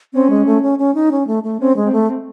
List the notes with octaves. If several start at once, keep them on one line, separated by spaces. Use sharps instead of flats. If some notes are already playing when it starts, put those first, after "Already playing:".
C4 C#4
G#3
A3
C#4
C#4
D#4
C#4
A3
A3
C4 C#4
G#3
C4
A3
C4